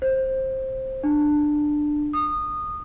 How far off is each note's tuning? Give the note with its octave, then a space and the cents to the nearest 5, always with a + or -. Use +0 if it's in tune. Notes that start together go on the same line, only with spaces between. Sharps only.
C5 +15
D4 +15
D#6 -20